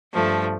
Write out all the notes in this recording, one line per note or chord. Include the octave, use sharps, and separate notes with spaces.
G2 F3 A3